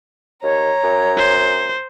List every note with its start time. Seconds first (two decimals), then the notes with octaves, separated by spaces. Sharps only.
0.43 D#2 C#5 A#5
0.83 F#2
1.17 C5